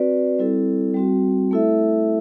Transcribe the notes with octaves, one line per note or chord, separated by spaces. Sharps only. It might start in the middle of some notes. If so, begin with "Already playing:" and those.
Already playing: C4 F#4 B4 D5
G3 C4 E4 A4
G3 C4 F#4
A3 E4 A4 E5